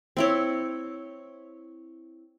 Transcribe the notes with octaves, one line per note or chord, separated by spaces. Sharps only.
C4 E4 C#5